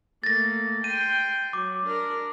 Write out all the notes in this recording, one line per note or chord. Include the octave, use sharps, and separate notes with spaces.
A3 A#3 A6 A#6
G5 C6 D#7
F#3 D6
D4 A#4